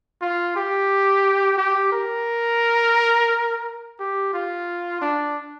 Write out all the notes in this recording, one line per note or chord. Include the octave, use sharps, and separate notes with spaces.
F4
G4
G4
A#4
G4
F4
D4